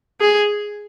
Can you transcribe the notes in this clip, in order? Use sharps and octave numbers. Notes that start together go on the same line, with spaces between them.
G#4